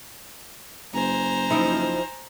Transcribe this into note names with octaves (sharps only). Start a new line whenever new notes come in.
F#1 C5 G#5 A#5
F3 D#4 E4